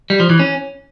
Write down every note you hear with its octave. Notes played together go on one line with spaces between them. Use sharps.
G3
F3
E3
C#4